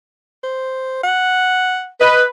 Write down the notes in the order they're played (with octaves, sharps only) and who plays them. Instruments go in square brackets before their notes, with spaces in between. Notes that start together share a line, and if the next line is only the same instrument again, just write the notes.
[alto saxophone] C5
F#5
[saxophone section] B4 [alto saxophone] D#5